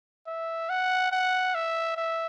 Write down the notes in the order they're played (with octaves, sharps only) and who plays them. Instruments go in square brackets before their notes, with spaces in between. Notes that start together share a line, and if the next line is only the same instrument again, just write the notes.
[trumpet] E5
F#5
F#5
E5
E5